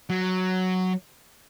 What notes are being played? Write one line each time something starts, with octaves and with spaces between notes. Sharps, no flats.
F#3